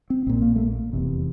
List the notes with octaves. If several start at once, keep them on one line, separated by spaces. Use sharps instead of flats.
C4
A#1 A#2 C4
A#3
A3
A#3
F1 E2 C3